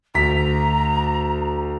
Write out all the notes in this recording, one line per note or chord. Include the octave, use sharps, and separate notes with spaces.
D2 A#5 B6